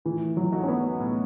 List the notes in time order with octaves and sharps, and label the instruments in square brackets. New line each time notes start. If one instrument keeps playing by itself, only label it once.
[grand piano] A2 [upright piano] E3
[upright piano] F#3
[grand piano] F#3 A3 D#4
[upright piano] C#4
B3
[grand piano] A2